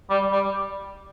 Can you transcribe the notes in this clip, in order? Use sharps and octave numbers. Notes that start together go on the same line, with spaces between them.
G3
G3